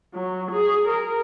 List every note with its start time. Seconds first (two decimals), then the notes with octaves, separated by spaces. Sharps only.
0.14 F#3
0.51 G#4
0.88 A#4